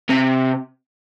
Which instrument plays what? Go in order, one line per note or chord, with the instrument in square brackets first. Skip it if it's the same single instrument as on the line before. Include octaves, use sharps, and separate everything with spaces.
[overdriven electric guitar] C3